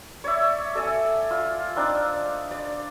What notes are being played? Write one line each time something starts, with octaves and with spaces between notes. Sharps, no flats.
C#5 D5 E5
A4 D5 E5 G#5
F4
C4 D4 D#4 D5
D5